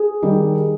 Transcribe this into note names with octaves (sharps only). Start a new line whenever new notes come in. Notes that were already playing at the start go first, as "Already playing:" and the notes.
Already playing: G#4
D#3 G3